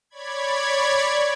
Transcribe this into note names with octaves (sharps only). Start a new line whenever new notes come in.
C#5 D5 B5 G#6